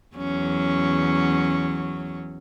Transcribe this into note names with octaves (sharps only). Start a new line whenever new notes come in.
E2 F#3 C#4